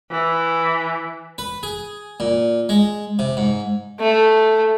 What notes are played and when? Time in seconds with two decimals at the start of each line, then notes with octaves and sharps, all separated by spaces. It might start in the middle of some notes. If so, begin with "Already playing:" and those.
0.11 E3
1.38 B4
1.63 G#4
2.20 A#2
2.69 G#3
3.19 C3
3.37 G#2
4.00 A3